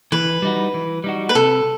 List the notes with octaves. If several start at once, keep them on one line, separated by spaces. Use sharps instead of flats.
E3 B4
G3 D#4 F#4
E3
G3 D#4 F#4
B4
C3 A4